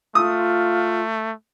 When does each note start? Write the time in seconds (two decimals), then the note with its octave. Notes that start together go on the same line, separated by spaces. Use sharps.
0.15 A3 F4 D#6